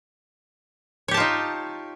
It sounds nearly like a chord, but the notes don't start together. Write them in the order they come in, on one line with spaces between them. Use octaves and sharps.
C#5 G4 A5 F4 D#4